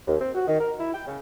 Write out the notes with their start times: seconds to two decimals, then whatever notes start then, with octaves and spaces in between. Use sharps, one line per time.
0.07 D#2
0.20 C4
0.35 F#4
0.47 D#3
0.60 A#4
0.80 E4
0.94 G5
1.07 C#3